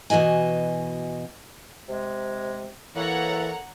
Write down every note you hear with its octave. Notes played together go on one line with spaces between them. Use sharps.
B2 E3 F#4 D#5 G#5
C3 G#3
E3 A#3 A4 C#5 F#5 A#5